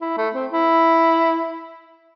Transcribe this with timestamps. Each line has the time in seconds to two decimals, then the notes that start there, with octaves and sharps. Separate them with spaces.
0.01 E4
0.17 A3
0.34 C4
0.51 E4